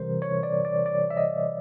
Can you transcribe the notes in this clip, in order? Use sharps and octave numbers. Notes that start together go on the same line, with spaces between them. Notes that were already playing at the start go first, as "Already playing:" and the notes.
Already playing: C3 E3 G3 A#4 C5
C#5
D5
D5
D5
E5
D#5